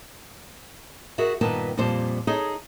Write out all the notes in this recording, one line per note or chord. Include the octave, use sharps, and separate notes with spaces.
F#4 G#4 A#4 E5
G2 A#2 D#3 B3 B4 A5
F2 A#2 F3 G3 C5 A5
D#4 G#4 A4 C#5 D#5